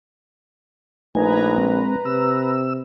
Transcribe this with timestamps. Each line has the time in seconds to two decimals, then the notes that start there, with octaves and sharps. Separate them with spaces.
1.15 A#1 A3 D#4 B4 G#5 A#5
1.58 G#3 C4
2.05 C3 E6